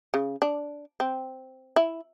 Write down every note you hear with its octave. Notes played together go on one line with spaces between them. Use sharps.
C#3
D4
C4
E4